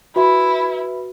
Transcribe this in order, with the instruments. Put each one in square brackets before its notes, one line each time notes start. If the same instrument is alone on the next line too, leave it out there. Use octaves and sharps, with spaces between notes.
[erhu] E4 [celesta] F#4 [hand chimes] B4 E5 B5